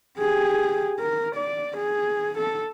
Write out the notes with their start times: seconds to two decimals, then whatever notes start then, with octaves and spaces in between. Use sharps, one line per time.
0.19 G4 G#4
0.99 A#4
1.36 D5
1.78 G#4
2.38 A4